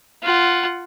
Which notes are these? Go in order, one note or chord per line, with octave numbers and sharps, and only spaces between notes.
F4 F#5